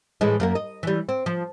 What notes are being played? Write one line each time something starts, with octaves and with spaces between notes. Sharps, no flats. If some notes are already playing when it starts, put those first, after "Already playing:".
A2 E3 G#3
F#2 A#3 A#4
D#5
E3 G3
C4
F3